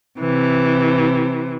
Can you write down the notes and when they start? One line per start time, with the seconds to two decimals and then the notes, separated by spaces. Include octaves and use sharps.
0.18 C3 E3